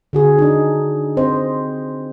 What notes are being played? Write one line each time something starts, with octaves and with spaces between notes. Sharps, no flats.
D3 F#4 G#4
D4 D#4
C4 C5 D#5